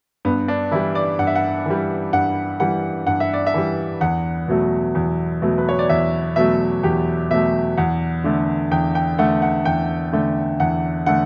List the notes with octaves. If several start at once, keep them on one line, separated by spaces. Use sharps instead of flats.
G2 B3
D4
E3 G3 E4
D5
G2 F#5
E5
F#5
E3 G3
G2 F#5
E3 G3 F#5
G2 F#5
E5
D5
E5
E3 G3
E2 F#5
B2 F#3 A3
E2
B2 F#3 A3
B4
C#5
D5
E2 E5
B2 F#3 A3 E5
E2 G4
B2 F#3 A3 E5
E2 F#5
D3 A3
E2 G5
G5
D3 A3 F#5
F#5
E2 G5
D3 A3
E2 F#5
D3 A3 F#5